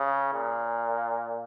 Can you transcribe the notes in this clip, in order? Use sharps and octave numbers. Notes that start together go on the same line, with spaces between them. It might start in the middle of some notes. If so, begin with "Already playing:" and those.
Already playing: C#3
A#2